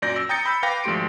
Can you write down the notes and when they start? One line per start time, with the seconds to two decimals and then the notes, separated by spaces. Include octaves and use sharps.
0.02 F#2 A#2 D5 G6 A#6
0.16 E6
0.29 G5 A#5 D#6 G6 A6 C#7
0.46 B5 E6 G6
0.63 B4 F5 G5 B5 D6 A#6
0.84 G#1 F3 A3 G4 C6 D7